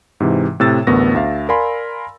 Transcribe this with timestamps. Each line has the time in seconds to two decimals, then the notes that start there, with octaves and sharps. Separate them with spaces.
0.20 G#2 C3 E3
0.60 A2 C3 E6 A6
0.87 A1 D2 B3 A#4 C#6 A#6
1.15 D2 E5 F5
1.49 A#4 D5 F5 G#5 B5 C6